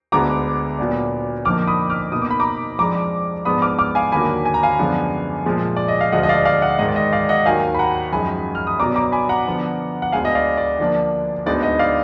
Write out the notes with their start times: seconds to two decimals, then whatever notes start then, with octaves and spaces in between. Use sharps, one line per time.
0.12 D2 D3 G#3 B3 A#5 D6
0.78 A#2 F#3 B3 D4
1.45 F2 D3 F3 A#3 D#4 D6 F6
1.67 B5 D#6
1.90 D6 F6
2.12 B2 A#3 D#4 D#6
2.22 D6
2.30 B5
2.40 A#5 D6
2.79 F2 F3 G#3 D4 A#5 D6
3.45 G#2 F3 G#3 B3 D4 B5 D#6
3.62 D6 F6
3.79 D6 F6
3.95 F5 G#5
4.12 D#2 D3 F#3 A#3 G#5 B5
4.45 G#5
4.54 A#5
4.63 F5 G#5
4.78 F#2 D3 F3 G#3 B3
5.46 A#2 F3 G#3
5.76 D5
5.88 D#5
6.01 F5
6.12 D2 D3 F3 G#3 D#5 F#5
6.23 D#5
6.29 D5 F5
6.45 D5 F5
6.62 D#5 F#5
6.79 G#2 D#3 G#3 D#5
6.88 D5
6.96 D#5
7.13 D5 F5
7.29 D#5 F#5
7.46 D#2 D#3 F#3 F5 G#5
7.74 B5
7.79 F#5 A#5
8.12 F#2 F3 G#3 D#4 G#5 B5
8.55 F6
8.67 D#6
8.79 B2 F#3 B3 D4 A#5 D6
8.96 A#5 D6
9.12 G#5 B5
9.29 F#5 A#5
9.46 D3 F3 B3 D4
10.02 F#5
10.12 D2 D3 G#3 B3 F5 G#5
10.25 D#5
10.35 D5 F5
10.57 D5
10.79 D3 F3 A#3 D4
11.46 D2 D3 G#3 B3 D#4 D5
11.63 D#5
11.79 D5 F5